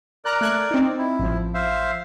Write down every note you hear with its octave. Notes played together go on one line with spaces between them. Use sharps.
A#4 D5 A#5 F#6
A3 F#6 G#6
C4 D#4
E4
A1 F3
C5 E5 F5